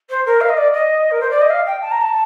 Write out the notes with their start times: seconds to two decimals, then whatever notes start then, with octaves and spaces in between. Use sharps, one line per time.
0.09 C5
0.26 A#4
0.40 F5
0.49 D#5
0.57 D5
0.73 D#5
1.11 A#4
1.20 C5
1.30 D5
1.41 D#5
1.50 F5
1.66 G5
1.81 A5
1.91 A#5
2.01 A5